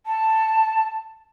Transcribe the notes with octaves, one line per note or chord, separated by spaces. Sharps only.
A5